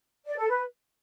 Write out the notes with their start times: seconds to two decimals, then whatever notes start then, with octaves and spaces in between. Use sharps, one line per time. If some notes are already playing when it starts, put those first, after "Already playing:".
0.25 D5
0.37 A4
0.48 B4